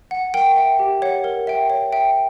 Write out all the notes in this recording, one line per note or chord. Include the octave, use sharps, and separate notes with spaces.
F#5
A#4 G5
E5 G5
G4
C#5 F#5
A#4
E5 G5
C#5
E5 G5